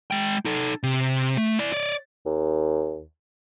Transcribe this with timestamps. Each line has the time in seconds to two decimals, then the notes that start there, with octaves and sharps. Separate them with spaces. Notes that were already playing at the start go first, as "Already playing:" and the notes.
0.11 G#3 G5
0.45 D#4 A4
0.83 C3
1.37 A3
1.59 E4 D5
1.73 C#5 D5
2.26 D#2